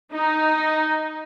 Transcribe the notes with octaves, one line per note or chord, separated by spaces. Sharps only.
D#4